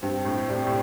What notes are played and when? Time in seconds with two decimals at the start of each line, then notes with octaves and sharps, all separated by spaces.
0.02 G2 C4
0.25 A2
0.48 C3 G3
0.67 A2